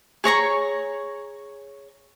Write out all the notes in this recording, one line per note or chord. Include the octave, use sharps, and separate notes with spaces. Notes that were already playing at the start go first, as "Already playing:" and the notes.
G#4 C#5 A#5 C#6